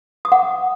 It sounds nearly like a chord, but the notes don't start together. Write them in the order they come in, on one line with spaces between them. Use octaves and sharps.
D#6 D6 F#5